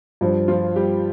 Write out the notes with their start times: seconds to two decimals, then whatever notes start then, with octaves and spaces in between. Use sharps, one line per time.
0.21 G2 F3
0.48 F3 F4
0.76 G3 G4